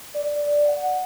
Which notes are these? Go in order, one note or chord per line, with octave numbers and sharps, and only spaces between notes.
D5
F#5